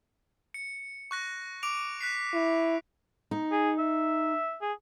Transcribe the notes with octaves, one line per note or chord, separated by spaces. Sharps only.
C#7
C#6 F#6 A#6
D6 D7 F7
F#6 B6 C7
E4
D#4
G#4
E5
G#4